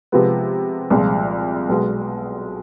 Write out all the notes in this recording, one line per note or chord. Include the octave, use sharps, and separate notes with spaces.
C3 F3 G#3 B3
C2 A#2 F3 G#3
B1 B2 G#3